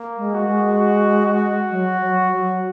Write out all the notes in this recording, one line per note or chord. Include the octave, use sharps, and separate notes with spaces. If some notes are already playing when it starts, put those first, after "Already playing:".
Already playing: A#3
G#3
F#4
G#3
F#4
F#4
F#3
F#3
F#3